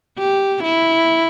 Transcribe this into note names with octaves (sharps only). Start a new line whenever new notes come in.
G4
E4